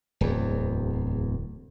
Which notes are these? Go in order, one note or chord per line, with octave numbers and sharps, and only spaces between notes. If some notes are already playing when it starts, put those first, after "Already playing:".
D1 E2